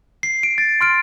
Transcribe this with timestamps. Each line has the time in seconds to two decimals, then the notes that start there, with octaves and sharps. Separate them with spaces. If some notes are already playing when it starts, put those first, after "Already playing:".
0.23 C7
0.43 D7
0.58 A6
0.81 C6 F6 D7